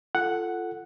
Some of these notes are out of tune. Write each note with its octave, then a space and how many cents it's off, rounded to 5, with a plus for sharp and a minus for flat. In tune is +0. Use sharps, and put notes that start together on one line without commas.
F4 -20 A4 +0 F#5 +0